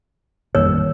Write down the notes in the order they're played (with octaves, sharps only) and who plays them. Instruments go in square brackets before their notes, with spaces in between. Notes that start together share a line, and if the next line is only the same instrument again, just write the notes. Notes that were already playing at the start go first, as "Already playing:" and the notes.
[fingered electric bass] A1 F2 G3 [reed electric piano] D#3 A#3 E6 [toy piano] C#5